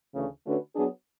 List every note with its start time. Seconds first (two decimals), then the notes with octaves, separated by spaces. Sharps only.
0.15 D2 C#3 E3 A3
0.45 D3 A3 C#4 F#4 B4
0.75 F#3 B3 D4 G#4